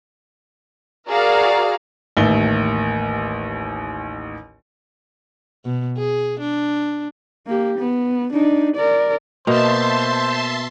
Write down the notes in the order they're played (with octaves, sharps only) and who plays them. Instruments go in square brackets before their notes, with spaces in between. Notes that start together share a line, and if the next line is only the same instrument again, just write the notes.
[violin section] F#4 G#4 A#4 D5 F5 A#5
[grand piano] A1 D#2 D#3 E5 G7
[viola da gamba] B2
G#4
D4
[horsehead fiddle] A#3 G4
B3
D4 D#4
A#4 D5
[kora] B2 [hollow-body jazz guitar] A#3 [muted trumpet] C5 [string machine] E5 A5 C6